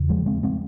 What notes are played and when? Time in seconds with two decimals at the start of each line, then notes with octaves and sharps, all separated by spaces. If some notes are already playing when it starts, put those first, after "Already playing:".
Already playing: E2 C#3
0.09 F3 G#3
0.26 G#3 C4
0.43 G#3 C4